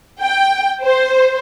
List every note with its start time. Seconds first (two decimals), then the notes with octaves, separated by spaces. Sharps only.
0.22 G5
0.82 C5